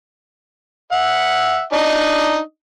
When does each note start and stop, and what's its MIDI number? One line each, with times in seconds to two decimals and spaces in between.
0.92 1.63 76
0.92 1.63 78
1.73 2.39 62
1.73 2.39 63
1.73 2.39 75